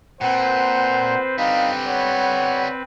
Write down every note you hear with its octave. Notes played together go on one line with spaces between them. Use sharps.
A#2 C4 B4 C5 F#5
D3 G3 D#4 F5
C#5 F#5